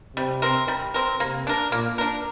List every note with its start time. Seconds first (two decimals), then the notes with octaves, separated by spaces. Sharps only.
0.17 C3 G3
0.42 C4 A#4
0.68 G3
0.94 C4 A#4
1.20 C3 A#3
1.47 D4 A#4
1.72 A#2 A#3
1.98 D4 A#4